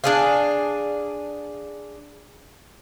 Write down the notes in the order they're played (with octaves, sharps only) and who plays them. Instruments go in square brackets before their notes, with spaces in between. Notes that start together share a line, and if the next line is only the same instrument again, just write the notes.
[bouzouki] D4 G#4 F5